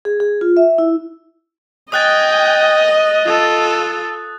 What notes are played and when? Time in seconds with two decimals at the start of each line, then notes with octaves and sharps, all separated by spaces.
0.05 G#4
0.20 G#4
0.41 F4
0.57 E5
0.78 E4
1.92 D#5 G5 G#5 D#6 F#6 A6
3.25 F4 A4